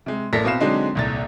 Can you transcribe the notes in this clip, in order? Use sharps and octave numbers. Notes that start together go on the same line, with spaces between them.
C3 G#3
A1 A#3 A4 D5 A#6 B6
B2 C4 B4 F5 C7 E7
D3 F#3 G#3 C4 D4 D#4
D#1 C2 A6